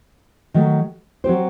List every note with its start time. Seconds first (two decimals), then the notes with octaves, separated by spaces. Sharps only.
0.54 D#3 F#3 A3 D#4
1.24 F#3 C4 G4 C5